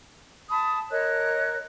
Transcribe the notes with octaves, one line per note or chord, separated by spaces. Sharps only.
A5 B5 D#6
A#4 C#5 D#5 F#6